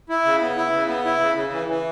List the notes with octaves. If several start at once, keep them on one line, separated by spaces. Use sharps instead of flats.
E4
C#3
B3
E4
C#3
B3
E4
C#3
C#3
E3
E3